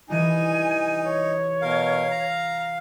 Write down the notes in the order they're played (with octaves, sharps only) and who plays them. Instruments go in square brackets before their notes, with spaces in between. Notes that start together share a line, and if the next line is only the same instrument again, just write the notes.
[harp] C2 E3 D#6 [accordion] D#4 [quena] G#5
[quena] C#5
[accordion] B2 A#4 [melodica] F5
[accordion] A#5